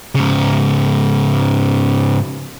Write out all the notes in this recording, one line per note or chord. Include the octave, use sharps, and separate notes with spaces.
G#2 C#3